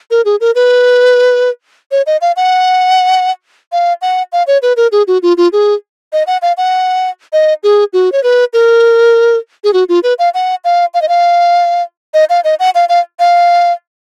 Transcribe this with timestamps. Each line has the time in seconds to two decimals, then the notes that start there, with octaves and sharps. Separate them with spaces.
0.11 A#4
0.25 G#4
0.41 A#4
0.55 B4
1.92 C#5
2.06 D#5
2.21 F5
2.36 F#5
3.72 F5
4.02 F#5
4.32 F5
4.47 C#5
4.62 B4
4.77 A#4
4.92 G#4
5.07 F#4
5.23 F4
5.37 F4
5.53 G#4
6.13 D#5
6.27 F#5
6.42 F5
6.58 F#5
7.33 D#5
7.63 G#4
7.93 F#4
8.12 C#5
8.23 B4
8.53 A#4
9.64 G#4
9.73 F#4
9.89 F4
10.03 B4
10.19 F5
10.34 F#5
10.64 F5
10.94 F5
11.02 D#5
11.09 F5
12.14 D#5
12.30 F5
12.44 D#5
12.60 F#5
12.75 F5
12.89 F5
13.20 F5